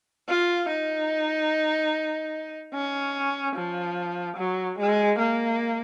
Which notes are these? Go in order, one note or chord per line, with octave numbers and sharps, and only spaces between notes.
F4
D#4
C#4
F3
F#3
G#3
A#3